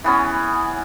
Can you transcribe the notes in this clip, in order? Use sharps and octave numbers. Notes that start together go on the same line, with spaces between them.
E3 B3 C#4